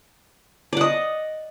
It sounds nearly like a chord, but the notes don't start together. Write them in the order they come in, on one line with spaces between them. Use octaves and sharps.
D5 F#5 D#5